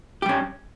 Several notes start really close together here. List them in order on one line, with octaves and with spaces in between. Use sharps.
G4 G3 C#4